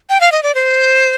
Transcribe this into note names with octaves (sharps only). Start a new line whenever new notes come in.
G5
F5
D#5
D5
C5